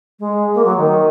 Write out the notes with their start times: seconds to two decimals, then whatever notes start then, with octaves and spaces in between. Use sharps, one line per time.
0.20 G#3
0.54 A#3
0.65 F#3
0.77 D#3